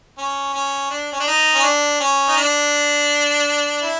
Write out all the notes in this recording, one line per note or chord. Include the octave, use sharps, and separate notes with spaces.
C#4
C#4
D4
C#4
D4
D#4
C#4
D4
C#4
D#4
D4
E4